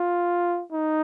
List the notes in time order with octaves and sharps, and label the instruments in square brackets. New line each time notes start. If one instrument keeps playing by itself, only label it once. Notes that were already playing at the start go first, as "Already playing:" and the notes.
Already playing: [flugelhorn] F4
D#4